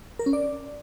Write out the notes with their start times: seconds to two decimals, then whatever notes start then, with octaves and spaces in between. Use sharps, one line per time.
0.19 A#4
0.26 C#4
0.33 D5